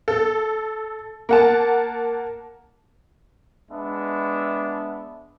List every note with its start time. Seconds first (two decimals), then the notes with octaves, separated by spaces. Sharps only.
0.08 A4
1.29 A#3 F#5 A5
3.70 G#3 B3 D4 E5